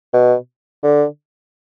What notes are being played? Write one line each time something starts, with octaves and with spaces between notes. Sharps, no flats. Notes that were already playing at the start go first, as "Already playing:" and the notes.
B2
D3